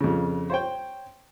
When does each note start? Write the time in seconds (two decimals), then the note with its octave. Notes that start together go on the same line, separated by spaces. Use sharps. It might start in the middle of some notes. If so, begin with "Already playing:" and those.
0.01 F2 C#3
0.50 C5 C#5 G5